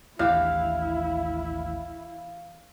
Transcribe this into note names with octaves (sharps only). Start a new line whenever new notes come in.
A1 D#2 E3 D4 E4 G4 F5